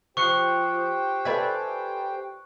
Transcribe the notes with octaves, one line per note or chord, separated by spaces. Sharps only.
F3 G4 C5 G5 C#6 F#6 C#7
A4 B4 D5 E5 G#5